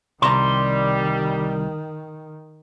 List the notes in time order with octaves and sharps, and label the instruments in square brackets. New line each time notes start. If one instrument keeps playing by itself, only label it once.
[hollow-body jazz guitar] C2 A5 A#5 [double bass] D#3 [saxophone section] G3 [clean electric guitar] C6